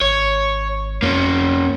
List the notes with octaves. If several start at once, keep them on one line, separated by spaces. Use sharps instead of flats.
G#1 C#5
F2 A#3 C#4